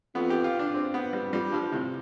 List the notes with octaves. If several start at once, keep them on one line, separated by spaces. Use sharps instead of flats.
F2 B3
G4
F4
D4
C4
B3
G3
F2 G3
G2 F3
A2 C3